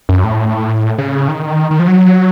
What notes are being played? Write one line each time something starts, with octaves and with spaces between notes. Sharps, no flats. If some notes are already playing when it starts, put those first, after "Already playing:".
F#2
A2
C#3
D#3
D#3
F3
F#3